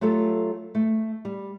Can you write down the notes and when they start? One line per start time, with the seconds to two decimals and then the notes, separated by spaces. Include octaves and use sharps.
0.01 F#3 A3 F4 G4 A4
0.75 A3
1.25 G3